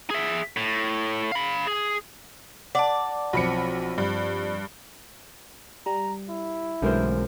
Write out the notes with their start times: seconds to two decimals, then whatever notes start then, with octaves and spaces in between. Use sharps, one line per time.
0.10 G#4 E5
0.57 A2
1.32 F5 B5
1.67 G#4
2.75 D5 F#5 A5
3.33 B1 F3 C4 B5 C#7
3.98 G2
5.86 G3 A#5
6.29 E4
6.82 B1 F#2 D3 E3 G#3 A3 A#4 C5